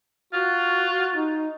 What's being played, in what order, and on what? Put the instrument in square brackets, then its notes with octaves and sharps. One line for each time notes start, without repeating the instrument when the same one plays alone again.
[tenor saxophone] F4 [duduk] F#4
[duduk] D#4